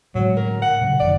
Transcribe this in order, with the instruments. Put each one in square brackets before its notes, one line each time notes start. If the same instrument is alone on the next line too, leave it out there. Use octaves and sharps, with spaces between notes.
[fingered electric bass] A2 D3 G#3 [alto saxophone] F#3
[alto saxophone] A#4
F#5
[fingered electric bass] A#2 C#3 F#3
[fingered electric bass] F#1 F#2 D#3 [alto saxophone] D5